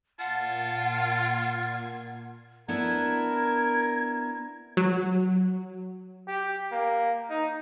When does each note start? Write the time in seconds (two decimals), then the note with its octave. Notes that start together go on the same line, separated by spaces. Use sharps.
0.19 A#2 F4 F#5 A5 G#6
2.68 B3 D4 E4 A#4 G#6
4.77 F#3
6.28 G4
6.71 A#3
7.30 D#4